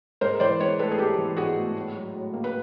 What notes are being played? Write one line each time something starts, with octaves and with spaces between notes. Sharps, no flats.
G#2 A#4 C5
E3 C5 D5
G#2 B4 C#5
A3 A4 B4
G#4
G#2 G4 A4
E3
G#2 F#4 G#4
A3
A2
F#3
A2
A#3
B4